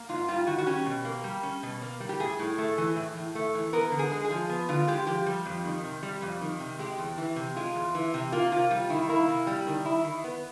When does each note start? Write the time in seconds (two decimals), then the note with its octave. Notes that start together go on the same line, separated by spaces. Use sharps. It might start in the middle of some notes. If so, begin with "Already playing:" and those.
Already playing: A#3
0.09 G#2 F4
0.28 G3 F4
0.47 D#3 F#4
0.58 F#4
0.66 C#4 G4
0.86 B2
1.05 A#3
1.24 G3
1.43 C#4
1.63 B2
1.82 A#3
2.00 G3
2.09 G4
2.19 A2 G#4
2.39 A2
2.58 A3
2.78 E3
2.96 A2
3.16 A2
3.35 A3
3.54 E3
3.73 B3 A#4
3.92 D3
3.99 G#4
4.11 G#3
4.24 G#4
4.30 F3
4.49 B3
4.69 D3 F4
4.88 G#3 G4
5.07 F3 G4
5.26 G3
5.46 F2
5.64 D#3
5.84 C3
6.03 G3
6.22 F2
6.41 D#3
6.60 C3
6.79 G#3 G4
6.98 E2
7.18 E3
7.36 C3
7.56 G#3 F4
7.75 E2
7.95 E3
8.14 C3
8.32 A#3 F4
8.51 C3 F4
8.70 G3 F4
8.90 D#3 E4
9.09 A#3 E4
9.28 C3
9.47 G3
9.67 D#3
9.85 E4
10.04 D#3
10.24 B3